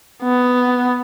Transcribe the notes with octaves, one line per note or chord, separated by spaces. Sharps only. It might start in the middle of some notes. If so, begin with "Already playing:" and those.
B3